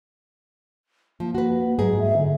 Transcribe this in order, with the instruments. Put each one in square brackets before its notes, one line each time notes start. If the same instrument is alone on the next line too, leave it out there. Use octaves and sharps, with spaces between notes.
[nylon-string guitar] F3 [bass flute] A#3
[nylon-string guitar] F#4 B4
[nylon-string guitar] G#2 G#4 [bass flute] F#3
[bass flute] E5
D3